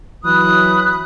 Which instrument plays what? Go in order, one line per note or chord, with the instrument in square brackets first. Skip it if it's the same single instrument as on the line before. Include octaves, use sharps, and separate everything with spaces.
[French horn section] E3 F#3 [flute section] B5 D#6 F#6